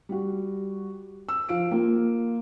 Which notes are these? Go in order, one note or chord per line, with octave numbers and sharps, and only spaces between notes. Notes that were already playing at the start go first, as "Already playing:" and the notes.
G3 F#4
E6
F3 F5 D7
A#3 F4